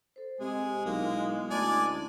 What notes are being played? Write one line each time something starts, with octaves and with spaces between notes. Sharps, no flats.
A4 C5
C3 G#3 G#4 D#5
B1 A#3 E4 A#4 F5
D2 C#4 E4 D5 G#5 A5